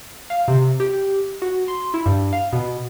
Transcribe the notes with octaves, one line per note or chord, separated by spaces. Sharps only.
F5
C3
G4
F#4
C6
E4
G2
F5
B2